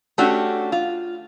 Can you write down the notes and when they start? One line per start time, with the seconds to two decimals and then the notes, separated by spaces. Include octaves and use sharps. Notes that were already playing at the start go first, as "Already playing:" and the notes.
0.18 A3 C#4 D4 F#4 G4
0.72 F4